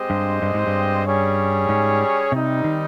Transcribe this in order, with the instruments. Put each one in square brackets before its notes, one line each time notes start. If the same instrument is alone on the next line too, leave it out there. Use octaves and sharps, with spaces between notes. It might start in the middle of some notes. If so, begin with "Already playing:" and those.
Already playing: [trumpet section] G#3 C4 G4 C5 D#5
[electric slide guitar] G2
G2
G#2
G2
[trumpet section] G3 C#4 G#4 C#5
[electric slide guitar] G#2
[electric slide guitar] C3 [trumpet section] G3 C4 D#4
[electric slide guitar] D#3